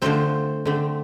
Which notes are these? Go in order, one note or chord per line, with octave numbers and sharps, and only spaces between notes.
D3 F3 A3 C4 C5
D3 A3 C4